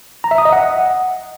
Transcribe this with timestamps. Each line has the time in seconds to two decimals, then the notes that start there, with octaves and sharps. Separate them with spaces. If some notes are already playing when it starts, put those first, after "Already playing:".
0.24 A#5
0.31 E5
0.38 D#6
0.45 D#5
0.52 F#5